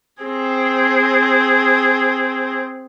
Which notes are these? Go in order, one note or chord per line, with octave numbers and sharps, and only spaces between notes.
C4 G#4